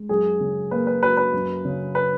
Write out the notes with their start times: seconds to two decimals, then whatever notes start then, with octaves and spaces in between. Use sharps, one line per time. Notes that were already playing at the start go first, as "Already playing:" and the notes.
Already playing: G#3
0.09 F#2 G#4
0.40 C#3
0.71 A#3 B4
0.87 B4
1.03 F#3 B4
1.17 B4
1.33 F#2
1.65 C#3
1.95 B4